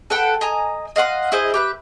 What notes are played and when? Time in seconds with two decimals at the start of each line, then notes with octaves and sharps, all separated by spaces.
0.10 A4 B4 F#5 G5
0.41 D#5 G#5 A#5
0.96 D#5 F5 F#5 C6
1.32 E4 G#4 C5 D#5
1.54 G4 B4 E5